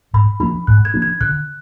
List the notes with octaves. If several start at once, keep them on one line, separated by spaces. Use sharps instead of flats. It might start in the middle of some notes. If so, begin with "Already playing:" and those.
G#2 B5
F3 A#3 D4 B5
G#2 F#6
G#6
F3 A#3 D4
G#6
D3 F#6